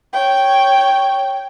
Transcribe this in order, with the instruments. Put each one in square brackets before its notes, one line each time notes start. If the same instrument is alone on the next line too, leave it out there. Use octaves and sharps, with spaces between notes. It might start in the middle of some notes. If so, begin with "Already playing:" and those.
[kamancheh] C#5 G5